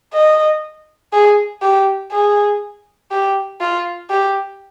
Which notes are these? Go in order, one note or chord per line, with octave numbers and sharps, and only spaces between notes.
D#5
G#4
G4
G#4
G4
F4
G4